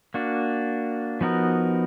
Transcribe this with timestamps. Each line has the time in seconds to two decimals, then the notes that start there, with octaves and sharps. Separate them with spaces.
0.14 A#3 D4 F#4
1.21 F3 B3 D#4 F#4 A#4